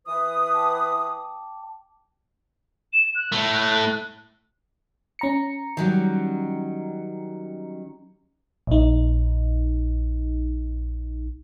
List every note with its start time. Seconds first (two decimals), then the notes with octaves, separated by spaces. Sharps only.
0.07 E3 B4 D#6
0.53 G5 A5 D6
2.93 E7
3.15 F#6
3.32 A2 A3
5.19 C#4 A#5 C#7
5.77 D#3 F#3 G3
8.67 A#1 D#4